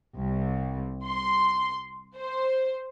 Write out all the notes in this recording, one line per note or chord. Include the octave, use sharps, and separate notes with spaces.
C2
C6
C5